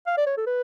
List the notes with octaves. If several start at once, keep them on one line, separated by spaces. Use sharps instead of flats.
F5
D5
C#5
A4
B4